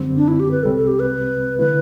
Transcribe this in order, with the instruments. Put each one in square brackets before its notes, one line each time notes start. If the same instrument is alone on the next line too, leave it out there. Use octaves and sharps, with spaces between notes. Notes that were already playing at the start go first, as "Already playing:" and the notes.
Already playing: [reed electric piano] F#2 D3 G3 C4
[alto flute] D4
E4
G4
B4
[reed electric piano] C2 C3 G3 C4 [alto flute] A4
[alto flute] A4
G4
B4
[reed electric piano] D3 A3 E4 [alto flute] B4